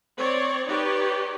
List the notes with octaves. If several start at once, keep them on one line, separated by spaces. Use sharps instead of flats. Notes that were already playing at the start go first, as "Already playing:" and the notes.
C4 C#5 D5
D#4 G4 B4 C#5 D5